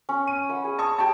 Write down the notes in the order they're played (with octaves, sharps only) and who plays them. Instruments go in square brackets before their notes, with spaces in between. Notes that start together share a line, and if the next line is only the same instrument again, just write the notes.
[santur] C#4
[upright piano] D#7
[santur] B4 F#5
G#4
[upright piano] A5 C#6 D#6
G4 A5